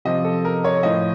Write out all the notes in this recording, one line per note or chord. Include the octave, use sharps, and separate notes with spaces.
C3 F3 D#5
A4
A#4
C#5
A2 F3 D#5